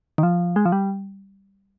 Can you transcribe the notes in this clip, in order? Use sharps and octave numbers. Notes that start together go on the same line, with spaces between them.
D#3
F3
G#3
F3
G3